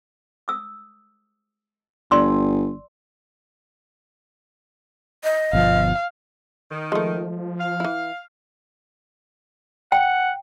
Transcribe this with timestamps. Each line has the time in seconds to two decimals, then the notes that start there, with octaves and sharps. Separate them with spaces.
0.48 D#6 E6
2.11 G1 D5 C6 E6
5.24 D#5
5.53 G1 B2 F3 F5
6.71 D#3
6.92 F3 G#3 A3
7.60 F5
7.80 E3 E4
9.92 F#5 G5